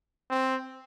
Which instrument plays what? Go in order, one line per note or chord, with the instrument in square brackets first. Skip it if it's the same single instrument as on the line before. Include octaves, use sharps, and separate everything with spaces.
[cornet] C4